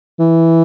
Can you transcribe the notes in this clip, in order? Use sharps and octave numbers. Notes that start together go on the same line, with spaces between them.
E3